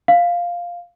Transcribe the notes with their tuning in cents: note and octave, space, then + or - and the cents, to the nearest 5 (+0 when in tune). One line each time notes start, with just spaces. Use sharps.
F5 +0